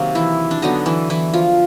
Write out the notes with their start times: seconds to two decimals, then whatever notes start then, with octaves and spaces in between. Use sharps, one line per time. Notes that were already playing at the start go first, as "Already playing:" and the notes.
Already playing: C3 D#3 F#3 A#3
0.15 E3 E4
0.51 D4
0.62 D3 F#3 B3 D4 D#4
0.86 E3 E4
1.10 E3 E4
1.34 F3 F4